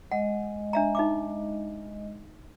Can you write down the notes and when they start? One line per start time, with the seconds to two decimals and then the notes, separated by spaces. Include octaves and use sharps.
0.12 G#3 D#5 F#5
0.73 D4 E5 A#5
0.95 D#4 E5 D6